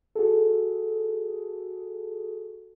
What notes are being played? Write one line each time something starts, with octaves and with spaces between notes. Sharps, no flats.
F#4 G#4 A4